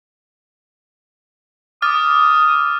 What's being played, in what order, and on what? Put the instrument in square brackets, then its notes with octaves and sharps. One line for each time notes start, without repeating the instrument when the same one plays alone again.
[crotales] D6 F6 A6 [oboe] D#6